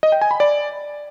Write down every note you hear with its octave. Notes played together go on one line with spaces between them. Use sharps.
D#5
G5
G#5
B5
D5